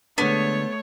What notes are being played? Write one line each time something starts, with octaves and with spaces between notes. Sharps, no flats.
D3 G#3 A3 B3 D4 C#5